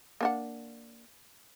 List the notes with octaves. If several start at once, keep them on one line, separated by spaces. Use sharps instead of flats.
A#3 D4 F#5